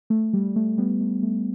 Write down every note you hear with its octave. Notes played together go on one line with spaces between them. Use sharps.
A3
G3
A3
G3 B3
A3
A3